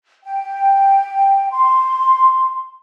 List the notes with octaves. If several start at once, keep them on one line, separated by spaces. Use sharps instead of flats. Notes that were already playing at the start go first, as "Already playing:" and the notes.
G5
C6